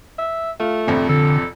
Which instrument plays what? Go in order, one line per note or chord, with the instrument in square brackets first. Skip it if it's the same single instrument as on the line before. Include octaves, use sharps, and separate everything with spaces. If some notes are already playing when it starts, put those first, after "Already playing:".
[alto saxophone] E5
[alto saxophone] A3 [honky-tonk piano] F4
[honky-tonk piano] A#1 F2 C3
[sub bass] D3 [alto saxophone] A4